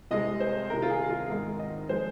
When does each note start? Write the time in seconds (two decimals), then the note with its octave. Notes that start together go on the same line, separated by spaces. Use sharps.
0.11 C2 C3 G#3 D#5
0.40 C5
0.70 C2 C3 D#3 A#4
0.82 F4
0.90 G#4
1.09 F4
1.29 G#2 D#3 G#3 A#4
1.59 D#5
1.89 F3 G#3 C5